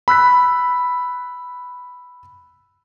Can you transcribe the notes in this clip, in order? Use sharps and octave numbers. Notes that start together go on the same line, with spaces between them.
B5 E6 F#6 B6